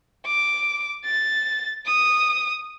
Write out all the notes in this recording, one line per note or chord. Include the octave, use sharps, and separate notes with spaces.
D6
A6
D#6